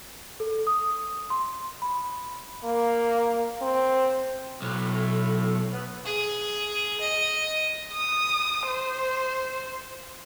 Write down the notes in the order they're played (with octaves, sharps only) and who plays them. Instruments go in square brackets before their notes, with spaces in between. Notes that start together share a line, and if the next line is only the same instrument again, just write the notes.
[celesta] A4
D#6
C6
B5
[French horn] A#3
C4
[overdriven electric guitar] B1 [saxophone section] A2
[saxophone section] B3
[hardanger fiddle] G#4
D#5
[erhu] D#6
C5